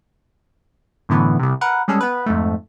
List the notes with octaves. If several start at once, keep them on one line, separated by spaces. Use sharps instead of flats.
F#2 A2 D3 E3 B3
C2 C3
A#4 B4 F#5
G3 G#3 C#4 G#4 A4
B3 B4
F2 G#2 A3